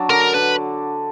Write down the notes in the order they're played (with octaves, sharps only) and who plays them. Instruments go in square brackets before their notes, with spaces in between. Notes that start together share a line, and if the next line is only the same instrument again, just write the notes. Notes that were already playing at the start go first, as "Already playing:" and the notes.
Already playing: [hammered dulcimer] F#3 D4 F#4
[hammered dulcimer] D3 [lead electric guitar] A#4
[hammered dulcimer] D3 [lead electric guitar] B4